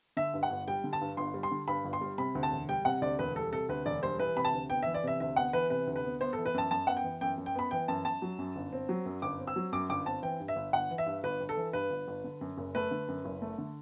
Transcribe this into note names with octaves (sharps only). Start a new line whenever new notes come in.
D3 E5
G2
F#5
G1
G3 G5
D3
A5
G2
G1 C6
G3
C6
D3
G2 B5
G1
C6
G3
C3 B5
D2
A5
E1
G3 G5
C3 F#5
D2 D5
E1 B4
G3 A4
C3 A4
D2 B4
E1 D5
G3 C5
E3 B4
C3 B5
A5
D2
B3 G5
E3 E5
D5
C3 E5
D2 E5
B3 F#5
E3 B4
C3 B4
D2
B4
B3
B3 C5
A4
E3
B4
F#2 A5
F#2 A5
B3 F#5
G5
E3
F#2 G5
F#2
G5
B3 B5
E3 G5
F#2 A5
F#2 A5
F#3
F#2
G1
C4
F#3
F#2
G1 D6
C4
E6
F#3
F#2 D6
G1 D6
C4 A5
E3 G5
G2
E5
G1
G1 F#5
E3
E5
G2
G1 B4
G1
A4
E3
G2 B4
G1
G1
D3
F#2
F#1
A3 B4
D3
F#2
F#1
A3
D3